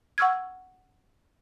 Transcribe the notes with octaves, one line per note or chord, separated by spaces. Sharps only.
F#5 C#6 E6 F6 G#6